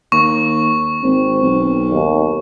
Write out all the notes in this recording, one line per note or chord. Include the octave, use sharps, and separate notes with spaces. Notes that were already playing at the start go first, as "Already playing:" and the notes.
D#2 C#6
G#1 C4
B1
D#2